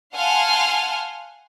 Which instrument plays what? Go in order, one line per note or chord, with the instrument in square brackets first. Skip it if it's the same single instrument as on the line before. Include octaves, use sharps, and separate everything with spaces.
[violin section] F5 F#5 G#5 A5 C6 F6